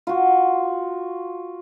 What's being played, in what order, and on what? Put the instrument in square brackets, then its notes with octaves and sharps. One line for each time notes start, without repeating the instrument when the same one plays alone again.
[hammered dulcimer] F4 F#4